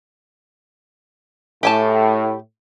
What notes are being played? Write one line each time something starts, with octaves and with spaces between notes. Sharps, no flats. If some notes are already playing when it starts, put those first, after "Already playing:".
A2 G4 G#5 A5